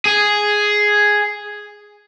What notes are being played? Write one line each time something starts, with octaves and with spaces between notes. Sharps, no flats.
G#4